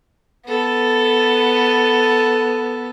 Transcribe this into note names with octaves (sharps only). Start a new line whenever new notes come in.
B3 A4